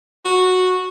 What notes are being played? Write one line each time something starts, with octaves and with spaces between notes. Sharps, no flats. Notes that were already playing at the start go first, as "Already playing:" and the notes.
F#4